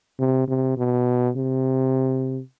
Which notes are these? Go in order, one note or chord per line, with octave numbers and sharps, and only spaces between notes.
C3
C3
B2
C3